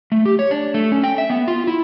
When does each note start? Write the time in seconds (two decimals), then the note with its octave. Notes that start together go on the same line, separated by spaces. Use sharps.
0.12 A3
0.26 G4
0.39 C#5
0.51 D4
0.74 A3
0.92 C#4
1.04 G5
1.18 E5
1.30 B3
1.48 F4
1.67 E4